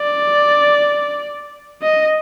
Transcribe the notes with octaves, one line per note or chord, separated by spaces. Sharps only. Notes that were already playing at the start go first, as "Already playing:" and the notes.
Already playing: D5
D#5